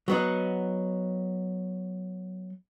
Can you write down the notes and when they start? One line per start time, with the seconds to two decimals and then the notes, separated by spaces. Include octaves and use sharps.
0.08 F#3 B3 D#4